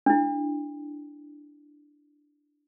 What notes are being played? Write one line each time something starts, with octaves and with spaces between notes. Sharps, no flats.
D4 E4